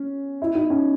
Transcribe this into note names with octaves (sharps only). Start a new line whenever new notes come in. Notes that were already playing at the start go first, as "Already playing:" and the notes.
Already playing: C#4
E4
D#4
C#4